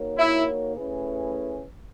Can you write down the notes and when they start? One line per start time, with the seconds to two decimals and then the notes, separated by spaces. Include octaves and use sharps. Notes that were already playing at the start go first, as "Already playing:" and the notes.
Already playing: A#3 D#4 F#4 A#4 C#5
0.17 E4
0.76 A3 C#4 E4 G#4 B4